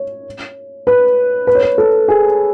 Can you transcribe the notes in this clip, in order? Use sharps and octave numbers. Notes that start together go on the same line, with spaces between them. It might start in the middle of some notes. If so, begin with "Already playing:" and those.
Already playing: C#5
B4
B4
C#5
B4
A4
G#4